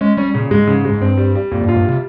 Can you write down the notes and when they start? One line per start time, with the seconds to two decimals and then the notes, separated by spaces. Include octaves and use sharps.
0.01 G#3 C#4
0.17 G3 C#4
0.34 A#2 C#3
0.51 G#2 G#3
0.67 C#3
0.85 G#2 G#3
1.01 G2 C4
1.17 G3
1.35 G3
1.52 F2 A#2
1.63 G2
1.69 G#2 F4
1.77 G2
1.85 C3 G3